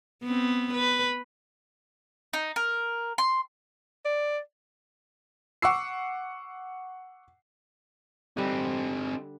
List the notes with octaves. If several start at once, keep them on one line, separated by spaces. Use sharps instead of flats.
B3 C4
B4
D#4
A#4
C6
D5
F#5 C#6 D6 E6 C7
D3 G3 C4 D#4